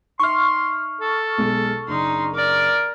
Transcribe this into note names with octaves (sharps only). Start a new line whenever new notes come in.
D#4 E5 C6 C#6 F6
A4
B1 B2 G#3
F#1 D4 D#4 C6
A#4 D5